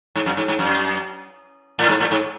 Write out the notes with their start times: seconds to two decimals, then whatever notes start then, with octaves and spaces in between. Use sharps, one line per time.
0.16 G#2
0.26 F#2
0.37 G#2
0.48 G#2
0.59 F#2
1.79 A2
1.89 G#2
2.00 A2
2.11 G#2